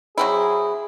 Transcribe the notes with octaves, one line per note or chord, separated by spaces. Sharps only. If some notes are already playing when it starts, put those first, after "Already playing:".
F#3 C4 E4 G#4